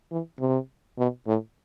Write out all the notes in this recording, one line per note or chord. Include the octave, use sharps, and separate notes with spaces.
E3
C3
B2
A2